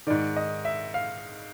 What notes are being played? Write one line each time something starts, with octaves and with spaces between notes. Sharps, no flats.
G#2 D#3 D5
D#5
E5
F5